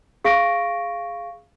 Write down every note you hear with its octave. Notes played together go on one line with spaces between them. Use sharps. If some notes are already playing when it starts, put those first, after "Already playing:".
G#4 F5 C#6 A#6 D7